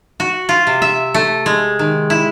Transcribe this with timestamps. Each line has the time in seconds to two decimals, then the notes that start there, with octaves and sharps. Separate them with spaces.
0.20 F#4
0.49 F4
0.67 C3
0.82 E5
1.14 A3
1.46 G#3
1.79 D#3
2.10 E4